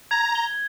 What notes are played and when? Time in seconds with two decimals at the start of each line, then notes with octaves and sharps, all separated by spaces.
0.11 A#5 G#6
0.35 G7